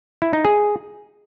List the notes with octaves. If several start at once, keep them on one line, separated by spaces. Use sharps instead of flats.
E4
D#4
G#4